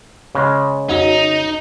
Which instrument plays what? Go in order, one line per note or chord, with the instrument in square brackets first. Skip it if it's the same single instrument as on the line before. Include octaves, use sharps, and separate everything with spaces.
[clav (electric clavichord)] C#3 G#3
[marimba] F2 F#4 C#5 [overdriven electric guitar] D#4